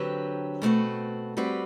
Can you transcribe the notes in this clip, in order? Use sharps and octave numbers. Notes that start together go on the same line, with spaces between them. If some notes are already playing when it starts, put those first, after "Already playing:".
Already playing: D3 F#3 C4 G4 B4
B2 A3 C4 F#4 B4
G3 C4 F#4 B4